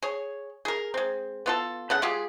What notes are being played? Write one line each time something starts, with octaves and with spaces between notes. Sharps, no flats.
G#4 C#5
G#4 A#4
G#3 C4
B3 F4 A4
C#3 B3 A4 F#5
G#3 F4 G4 G#4